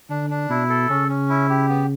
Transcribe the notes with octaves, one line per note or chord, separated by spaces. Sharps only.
D3 D4
D4
B2 E4
A4
C#3 C#4
C#4
E4
G4
B3